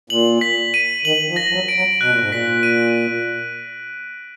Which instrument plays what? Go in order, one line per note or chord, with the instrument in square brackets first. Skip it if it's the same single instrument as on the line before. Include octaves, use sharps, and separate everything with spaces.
[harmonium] A#2 [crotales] F#7
[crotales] B6
D#7
[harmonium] D#3 [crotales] F#7
[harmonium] F3
[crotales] A#6
[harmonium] F3
F#3
[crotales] D7
[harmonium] F#3
[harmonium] B2 [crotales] F#6
[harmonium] A#2
G#2
[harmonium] A#2 [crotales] B6
[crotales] D#7